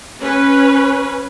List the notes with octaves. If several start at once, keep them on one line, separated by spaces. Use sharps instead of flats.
C#4 B4